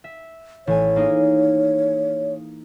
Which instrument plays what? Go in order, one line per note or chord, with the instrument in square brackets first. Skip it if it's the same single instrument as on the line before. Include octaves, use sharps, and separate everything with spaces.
[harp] E5
[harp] A1 G#5 [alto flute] C#5
[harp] A#3 D#4 G#4